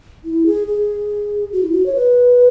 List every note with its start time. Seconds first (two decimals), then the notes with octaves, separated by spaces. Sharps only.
0.25 E4
0.46 G#4
0.67 G#4
1.52 F#4
1.63 E4
1.72 F#4
1.86 C#5
1.96 B4